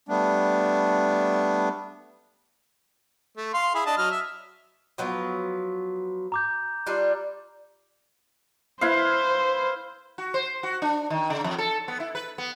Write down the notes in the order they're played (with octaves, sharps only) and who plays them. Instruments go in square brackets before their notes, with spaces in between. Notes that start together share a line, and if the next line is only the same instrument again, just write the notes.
[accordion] G3 A3 B3 D4
[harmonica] A3
F5 C6
E4 G#4 B5
D4 D#5 A5
F#3 D#5 F6
E5
[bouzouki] F3 F#3 B3
[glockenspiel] A#5 D6 G6
[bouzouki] G3 D4 F4
[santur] E4 B4 F5 [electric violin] C5
[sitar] F#4
C5
F#4
D4
D#3
C#3
F2
A4
B3
E4
B4
B3